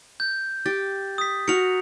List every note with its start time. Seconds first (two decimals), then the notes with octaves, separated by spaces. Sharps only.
0.20 G6
0.66 G4 A6
1.18 D#6 B6
1.48 F#4 A#4 C#7 F7